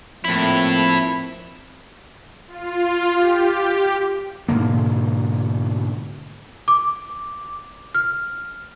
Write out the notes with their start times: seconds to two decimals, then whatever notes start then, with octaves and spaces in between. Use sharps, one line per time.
0.25 A2 F3 A#3 C4 E4
2.47 F4
3.12 G4
4.48 G#2 B2 D3 A#3
6.68 D6
7.95 F6